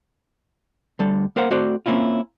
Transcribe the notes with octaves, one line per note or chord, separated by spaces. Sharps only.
D2 D3 G3 A4
A#3 A#4 C5 F5 F#5
A3 C4 F#4 C5 D5
A#3 C4 C#4 E4 F4